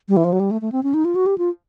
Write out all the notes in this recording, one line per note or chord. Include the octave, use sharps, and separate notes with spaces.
G3
E3
F3
F#3
G3
A3
A3
C4
C#4
D#4
F4
F#4
G4
F4